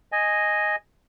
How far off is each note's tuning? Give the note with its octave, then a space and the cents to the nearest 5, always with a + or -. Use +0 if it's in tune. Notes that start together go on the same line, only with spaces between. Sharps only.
D#5 +0 G#5 +0